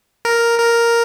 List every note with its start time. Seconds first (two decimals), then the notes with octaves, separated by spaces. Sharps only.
0.25 A#4
0.60 A#4